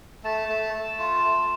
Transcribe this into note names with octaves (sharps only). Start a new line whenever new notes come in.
A3 A5
A3
A3
F4
A3